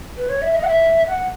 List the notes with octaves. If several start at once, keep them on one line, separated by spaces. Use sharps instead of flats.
B4
C#5
E5
D#5
F#5
E5
F#5